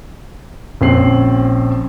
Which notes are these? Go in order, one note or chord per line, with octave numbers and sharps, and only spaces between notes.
A#1 C4 C#4 C7 F#7